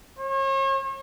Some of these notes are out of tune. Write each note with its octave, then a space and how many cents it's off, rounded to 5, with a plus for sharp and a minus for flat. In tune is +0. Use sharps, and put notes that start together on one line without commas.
C#5 -40